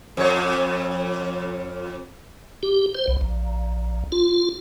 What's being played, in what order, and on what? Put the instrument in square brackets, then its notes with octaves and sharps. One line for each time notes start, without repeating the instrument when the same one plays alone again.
[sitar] F2 C#5
[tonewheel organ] G4
C5
B1
A#1
F4